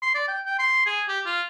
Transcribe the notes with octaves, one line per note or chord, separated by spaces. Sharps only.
C6
D5
G5
G5
C6
G#4
G4
F4